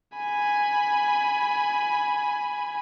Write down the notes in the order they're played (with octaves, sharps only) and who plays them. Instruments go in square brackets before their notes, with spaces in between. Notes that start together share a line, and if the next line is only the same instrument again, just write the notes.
[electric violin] G#5 B5